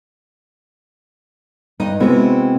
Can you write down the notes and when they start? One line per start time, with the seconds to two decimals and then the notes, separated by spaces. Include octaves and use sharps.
1.80 G2 D#4
2.00 C3 G#3 B3 C4 E4 F#4